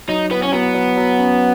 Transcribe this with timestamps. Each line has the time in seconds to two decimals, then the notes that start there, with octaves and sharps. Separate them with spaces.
0.08 F#3 D#4
0.31 B3 E4
0.43 C#4
0.53 F#3 B3
0.75 F#3
0.97 F#3
1.19 C#4